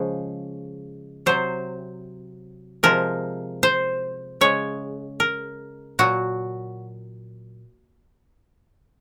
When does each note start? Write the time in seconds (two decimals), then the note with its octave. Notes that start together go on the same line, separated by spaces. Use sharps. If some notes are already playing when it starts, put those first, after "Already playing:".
Already playing: C#3 F3 G#3
1.26 C3 F#3 C5
2.83 C3 F3 G#3 A#4
3.63 C5
4.41 C#3 G#3 C#5
5.20 A#4
5.99 A#2 F#3 F#4